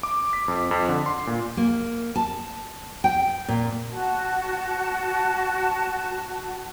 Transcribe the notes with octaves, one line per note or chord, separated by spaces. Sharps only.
D6
B6
F2
F2
D3
C6
A#2
A#3
A5
G5
A#2
F#4 A5